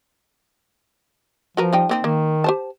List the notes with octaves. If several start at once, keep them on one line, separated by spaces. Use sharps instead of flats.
F3 F#4 A#4 B4
G3 D#4 G5
A#3 C4 D#4
D#3 A#3
G4 C5 A5